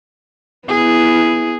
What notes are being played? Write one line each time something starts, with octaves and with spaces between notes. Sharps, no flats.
B3 E4 G#4